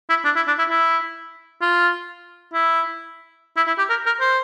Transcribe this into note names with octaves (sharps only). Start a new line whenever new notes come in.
E4
D4
E4
D4
E4
E4
F4
E4
E4
E4
G4
A#4
A#4
C5